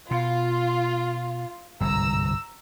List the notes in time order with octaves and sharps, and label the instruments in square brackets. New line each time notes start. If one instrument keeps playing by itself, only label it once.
[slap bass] B2 [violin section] F4
[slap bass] G1 C2 G#2 [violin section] A#5 E6